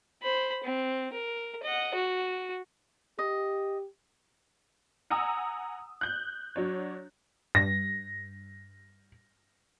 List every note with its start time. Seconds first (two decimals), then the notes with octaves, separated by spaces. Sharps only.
0.23 C5 B5
0.64 C4
1.13 A#4
1.63 D#5 F#5
1.95 F#4
3.19 G4 D#5
5.10 F#5 G#5 A#5 D#6 E6
6.01 F#6 G6
6.56 F#3 D4 C#5
7.55 G2 A#6